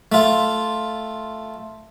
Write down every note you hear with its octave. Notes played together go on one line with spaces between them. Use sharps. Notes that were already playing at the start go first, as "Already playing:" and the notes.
A3 F4